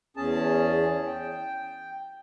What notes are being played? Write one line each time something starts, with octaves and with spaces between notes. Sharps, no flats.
E2 C#4 G#4 A5
G5